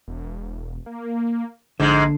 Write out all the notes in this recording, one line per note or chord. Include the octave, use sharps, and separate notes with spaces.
E1
A#3
A#1 G#2 D3 G#3